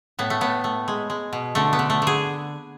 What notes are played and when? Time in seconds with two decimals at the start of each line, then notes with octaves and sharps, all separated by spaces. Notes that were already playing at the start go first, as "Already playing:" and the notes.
0.19 A2 B3
0.30 A3
0.41 A2 B3
0.64 A3
0.88 G#3
1.10 G#3
1.33 B2
1.55 D3 A3
1.73 B3
1.79 D3
1.90 A3
2.02 D3 G#4